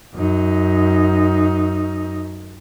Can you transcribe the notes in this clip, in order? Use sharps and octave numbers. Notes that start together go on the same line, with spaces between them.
F#2 D#4